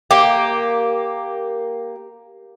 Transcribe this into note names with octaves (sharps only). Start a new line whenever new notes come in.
A#3 G4